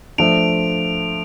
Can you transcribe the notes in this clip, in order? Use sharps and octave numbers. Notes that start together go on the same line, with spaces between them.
F3 A3 D4 D7 F7